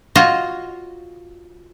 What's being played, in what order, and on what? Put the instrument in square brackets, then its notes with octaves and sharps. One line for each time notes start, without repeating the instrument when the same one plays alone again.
[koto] F4 F#4 C#5 D#5